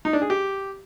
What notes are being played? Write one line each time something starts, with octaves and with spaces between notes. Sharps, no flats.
D#4
D4
G#4
G4